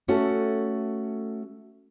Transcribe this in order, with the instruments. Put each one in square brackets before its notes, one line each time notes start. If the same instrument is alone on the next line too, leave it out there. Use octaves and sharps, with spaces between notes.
[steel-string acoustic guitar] A3 C#4 F#4 A4 E5